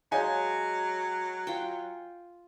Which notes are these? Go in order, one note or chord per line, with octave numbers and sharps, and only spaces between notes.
F#3 G#3 C#5 F5 G#5
F4 G5